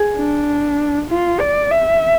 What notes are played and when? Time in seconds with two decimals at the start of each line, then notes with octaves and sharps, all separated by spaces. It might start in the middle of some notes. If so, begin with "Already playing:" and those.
Already playing: G#4
0.17 D4
1.10 F4
1.40 D5
1.71 E5